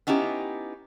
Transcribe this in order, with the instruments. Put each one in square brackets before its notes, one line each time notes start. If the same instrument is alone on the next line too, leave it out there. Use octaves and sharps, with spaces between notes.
[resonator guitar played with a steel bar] B3 C#4 D#4 E4 G4